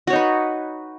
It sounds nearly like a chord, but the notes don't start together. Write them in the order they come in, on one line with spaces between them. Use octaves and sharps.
F#4 C#5 D#4 B4